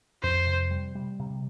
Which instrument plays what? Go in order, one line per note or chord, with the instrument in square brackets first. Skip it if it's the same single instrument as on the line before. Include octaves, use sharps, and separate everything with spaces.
[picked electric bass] F2 [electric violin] C5
[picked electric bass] C3
G3
G3
C3